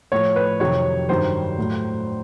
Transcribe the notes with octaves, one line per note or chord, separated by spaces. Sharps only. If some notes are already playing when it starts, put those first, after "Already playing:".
A2 F3 C#5
B4
F2 C3 D#3 F#3 C#5
G2 D#3 F#3 C5
A2 F#3